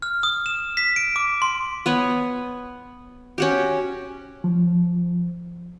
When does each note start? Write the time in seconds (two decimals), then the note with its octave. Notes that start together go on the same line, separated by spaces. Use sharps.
0.02 F6
0.23 D#6
0.46 E7
0.77 B6
0.96 D7
1.16 D6
1.42 C6
1.86 B3 B4 C#5
3.38 C#4 F#4 G4
4.44 F3